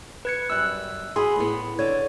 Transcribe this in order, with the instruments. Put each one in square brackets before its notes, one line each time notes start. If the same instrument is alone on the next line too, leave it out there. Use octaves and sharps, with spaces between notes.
[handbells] B4 G#6 C#7
[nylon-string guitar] F#2 G3 [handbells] E6 F#6
[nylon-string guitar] F#4 G#4 [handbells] B5 C6
[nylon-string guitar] A2 B3
[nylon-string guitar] D3 [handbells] C#5